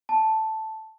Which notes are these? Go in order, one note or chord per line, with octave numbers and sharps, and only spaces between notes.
A5